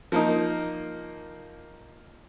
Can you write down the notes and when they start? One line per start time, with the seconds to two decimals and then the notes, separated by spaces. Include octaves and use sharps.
0.12 F3 A#3 D#4